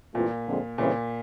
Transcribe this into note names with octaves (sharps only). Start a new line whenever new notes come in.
G2 A#2 E3 A3 C4 F4
F2 D3 F3 G#3 C4
A#2 C#3 E3 G3 C4